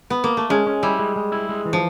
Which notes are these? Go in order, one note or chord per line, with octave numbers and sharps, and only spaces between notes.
B3
A#3
A3
G#3 C#4
C#4
G3 E4
G#3
G#3
E4
G#3
E3
F3